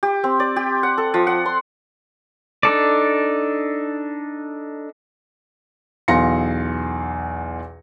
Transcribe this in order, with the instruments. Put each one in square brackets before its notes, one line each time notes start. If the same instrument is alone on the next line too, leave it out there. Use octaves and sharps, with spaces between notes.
[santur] G4
C4
D5
G4
F#5
A4
F3
F#5
C6
[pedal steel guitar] D4 D#4 A4 D5
[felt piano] B1 E2 F5 C6 A#6 C#7